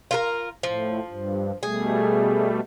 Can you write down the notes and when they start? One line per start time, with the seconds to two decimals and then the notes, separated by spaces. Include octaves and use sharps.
0.11 F4 A4 A#4
0.63 A2 F3
1.07 G2
1.63 B2 G3 A3 G#4